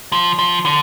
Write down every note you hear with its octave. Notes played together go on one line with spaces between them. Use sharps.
F3
F3
D3